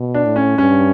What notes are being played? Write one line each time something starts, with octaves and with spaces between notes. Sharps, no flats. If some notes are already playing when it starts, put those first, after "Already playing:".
Already playing: B2
D4
A2
C#4
G2 C#4